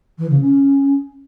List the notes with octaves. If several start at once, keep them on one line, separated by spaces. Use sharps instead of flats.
E3
C#3
C#4